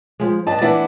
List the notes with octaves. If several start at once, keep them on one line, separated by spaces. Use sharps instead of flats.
F3 G#3
G2 D#5 A5
E3 B3 D4 E4